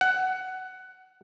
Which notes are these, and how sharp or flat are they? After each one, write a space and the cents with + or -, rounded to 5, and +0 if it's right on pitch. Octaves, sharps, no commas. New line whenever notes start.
F#5 +15